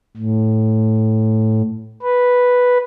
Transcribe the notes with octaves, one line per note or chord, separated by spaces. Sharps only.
A2
B4